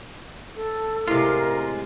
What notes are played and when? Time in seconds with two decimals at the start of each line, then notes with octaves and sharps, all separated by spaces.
0.56 A4
1.08 A2 C3 G#3 F4 A#4